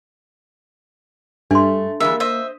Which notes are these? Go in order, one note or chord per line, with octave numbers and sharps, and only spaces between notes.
G2 A3 D4 C6
E3 G3 G#3 A#3 E5
C5 D#5 E5